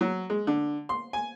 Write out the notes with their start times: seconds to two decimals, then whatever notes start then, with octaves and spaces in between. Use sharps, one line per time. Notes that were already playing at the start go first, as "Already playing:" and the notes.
0.01 F#3
0.30 G#3
0.47 D3
0.89 C6
1.13 G#5